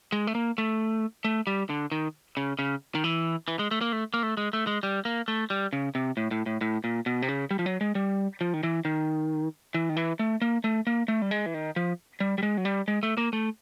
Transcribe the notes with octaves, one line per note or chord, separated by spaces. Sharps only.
G#3
A3
A#3
A3
A3
G3
D3
D#3
C#3
C#3
D#3
E3
E3
G#3
A3
A#3
A3
A#3
A3
G#3
A3
G#3
G3
A#3
A3
G3
C#3
C3
A2
A2
A2
A2
A#2
B2
C3
C#3
G3
F3
F#3
G#3
G3
F3
D#3
E3
D#3
E3
D#3
E3
A3
A#3
A3
A#3
A3
G3
G#3
E3
D#3
F3
G3
G3
G#3
F#3
G3
G#3
A3
A#3
A3